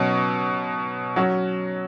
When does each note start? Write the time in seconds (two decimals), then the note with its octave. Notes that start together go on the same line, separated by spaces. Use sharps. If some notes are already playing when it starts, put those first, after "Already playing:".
Already playing: B2 F#3 C#4
1.16 F#3 C#4 F#4